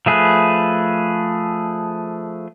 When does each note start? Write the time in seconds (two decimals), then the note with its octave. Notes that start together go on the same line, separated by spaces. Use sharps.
0.06 F3 A3 G#4 B4